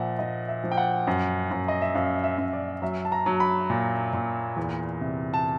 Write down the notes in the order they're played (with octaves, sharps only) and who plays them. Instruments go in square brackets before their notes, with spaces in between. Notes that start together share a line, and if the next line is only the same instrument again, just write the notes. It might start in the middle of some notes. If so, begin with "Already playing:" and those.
Already playing: [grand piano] A#2 F3 E5 F#5
F3 D#5
E5
F3
G5
F#5
F#2
F#2
D#5
E5
F#2 F5
E5
F#2
D5
F#3 E5
A5
A#5
F#3
B5
A#2
A#2
E2
C3
A5